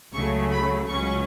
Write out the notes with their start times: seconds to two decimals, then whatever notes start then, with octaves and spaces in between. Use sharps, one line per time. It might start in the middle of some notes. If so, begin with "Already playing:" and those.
0.13 C#2 C#3 F#3 A3 C#6
0.51 B5
0.88 C#2 C#3 F#3 C#4 C#6